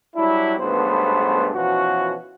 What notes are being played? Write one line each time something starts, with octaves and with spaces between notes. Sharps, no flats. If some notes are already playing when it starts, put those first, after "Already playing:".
F#3 G3 D4 E4
B1 G2 G#3 A3 B3 C5
B2 E3 F3 C#4 F#4